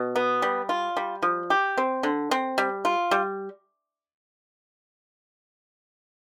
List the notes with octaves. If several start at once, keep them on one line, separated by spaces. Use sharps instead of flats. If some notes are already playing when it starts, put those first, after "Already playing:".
Already playing: B2
B3
G3
F4
G3
F3
G4
C4
D3
C4
G3
F4
G3